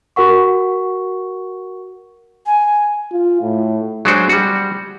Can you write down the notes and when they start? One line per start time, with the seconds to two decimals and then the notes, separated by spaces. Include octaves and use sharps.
0.16 F#4 A#4 F#5 C#6
2.46 G#5
3.12 F4
3.42 A2
4.05 F#3 G#3 D4 F#4 C5
4.29 G3 F#4